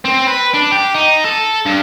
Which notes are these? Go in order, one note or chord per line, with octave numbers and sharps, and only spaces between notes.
C4
B4
D4
G4
D#4
A4
G2